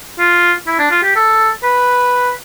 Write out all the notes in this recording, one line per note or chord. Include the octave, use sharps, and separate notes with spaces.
F4
E4
D4
F4
G4
A4
B4